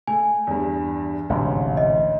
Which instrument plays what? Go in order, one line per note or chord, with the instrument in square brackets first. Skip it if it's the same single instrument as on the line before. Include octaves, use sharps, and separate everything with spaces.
[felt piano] A3 [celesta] G#5
[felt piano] E2 G2
[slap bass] A1 G#2 C3 [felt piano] D2
[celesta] D#5